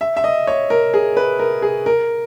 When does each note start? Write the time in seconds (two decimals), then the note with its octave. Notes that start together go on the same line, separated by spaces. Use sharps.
0.01 E5
0.17 E5
0.24 D#5
0.47 C#5
0.70 A#4
0.94 G#4
1.17 B4
1.39 A#4
1.62 G#4
1.86 A#4